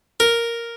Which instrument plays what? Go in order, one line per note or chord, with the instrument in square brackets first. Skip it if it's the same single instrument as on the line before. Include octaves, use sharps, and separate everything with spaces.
[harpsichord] A#4